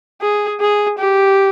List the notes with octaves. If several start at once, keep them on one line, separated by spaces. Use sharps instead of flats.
G#4
G#4
G4